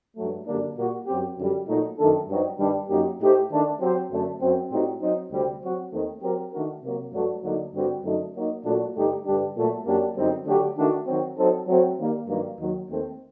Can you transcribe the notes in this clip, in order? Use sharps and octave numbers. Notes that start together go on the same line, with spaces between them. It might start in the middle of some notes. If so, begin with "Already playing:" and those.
G2 F#3 A3
F#2 D3 G3 A#3 D4
A#2 G3 A#3 F#4
F#2 F#3 C4 G4
F#2 D3 G3
A#2 F#3 A3 D#4
F#2 D#3 A3 D4 A4
G2 F#3 C4 D#4
G2 D#3 G3 D4
F#2 F#3 A#3 D#4 G4
A2 A3 D#4 G4 C5
D#3 A3 D4
F#3 C4 G4 C5
F#2 D3 A3
F#2 F#3 C4
A2 G3 C4 D#4 F#4
F#3 C4 D#4
D2 C3 G3 C4
F#3 C4 F#4
D#2 D#3 A3 C4 D#4
F#3 C4 G4 A#4
D#3 A3 D4 F#4 A#4
C3 F#3 A#3
G2 F#3 A3 D4 F#4
D2 D3 F#3 A#3 D#4
G2 D3 G3 C4 F#4
F#2 D3 F#3 A3 D#4
F#3 A#3 D#4
A#2 F#3 A3 D4 F#4
G2 D3 A3 D#4 G4
G2 D3 G3 D4 G4
A#2 F#3 A3
F#2 F#3 A#3 D4 G4
F#2 D3 G3 C4 D#4
D3 F#3 A3 D4 G4
D#3 A3 D4 F#4
D#3 F#3 C4
F#3 C4 D#4 A4 C5
F#3 A3 C4 F#4
D#3 G3 A#3
G2 D#3 F#3 A#3
D#2 D#3 F#3
D#2 D#3 A3 C4